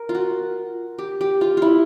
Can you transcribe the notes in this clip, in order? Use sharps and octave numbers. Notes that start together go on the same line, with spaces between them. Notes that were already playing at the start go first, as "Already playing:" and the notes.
Already playing: A#4
F4
F#4
G4
G4
F4
E4 F4